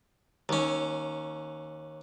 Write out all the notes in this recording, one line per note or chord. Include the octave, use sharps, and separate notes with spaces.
D#2 C#4